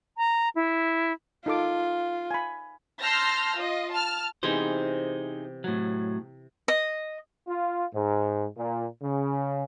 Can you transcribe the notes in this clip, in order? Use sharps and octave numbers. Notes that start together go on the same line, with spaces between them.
A#5
E4
D#4 F4 A4 D6
G#5 B5
A5 C6 E6 F6 G6 A#6
F4 D#5
A5 F6
C3 E3 B3 D#4 G#4 C5
A2 F#3
D#5
F4
G#2
A#2
C#3